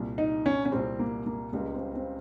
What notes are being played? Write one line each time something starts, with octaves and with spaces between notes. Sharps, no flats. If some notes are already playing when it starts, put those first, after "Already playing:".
Already playing: C2 A#2 G3
D#4
C#4
C#4
C2 A#2 G3 C4
A#3
A#3
C#2 C#3 G3 A#3
C4
C4